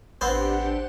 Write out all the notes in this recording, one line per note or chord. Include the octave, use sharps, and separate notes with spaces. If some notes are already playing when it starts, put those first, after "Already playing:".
A1 B3 C4 D4 G4 C5 F#5